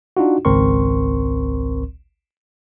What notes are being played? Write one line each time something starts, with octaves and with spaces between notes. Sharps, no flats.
D4 D#4 F4 F#4
G#1 C#2 C4 A#4 C6 C#6